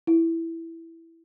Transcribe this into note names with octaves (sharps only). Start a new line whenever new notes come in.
E4